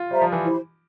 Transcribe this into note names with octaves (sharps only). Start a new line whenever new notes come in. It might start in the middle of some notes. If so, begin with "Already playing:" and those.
Already playing: F4
G3 C5 E5 A#5
F3
E3
E4 G4 C5